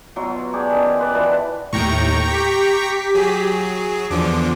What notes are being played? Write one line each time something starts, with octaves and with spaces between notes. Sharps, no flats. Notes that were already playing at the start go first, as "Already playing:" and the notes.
B2 F#3 F4
D4 G4 G#4
D#3 C#4
F4 B4 D5
E3 D4 F#4 B4
D#2 A2 G5 A#5 C#6
G4 B6
F#3 G#4
E2 D3 F3 D6